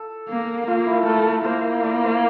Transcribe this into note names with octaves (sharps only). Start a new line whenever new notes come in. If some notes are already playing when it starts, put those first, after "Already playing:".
Already playing: A4
A#3
A#3 F4
E4
A3 A#4
A#4
A#3 C5
D5
C5